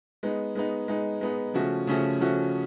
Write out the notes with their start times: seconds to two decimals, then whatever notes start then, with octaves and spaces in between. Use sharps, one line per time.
0.23 G#3 B3 D#4
0.55 G#3 B3 D#4
0.88 G#3 B3 D#4
1.21 G#3 B3 D#4
1.54 C#3 F3 A3 C#4 F#4
1.87 C#3 F3 A3 C#4 F#4
2.20 C#3 F3 A3 C#4 F#4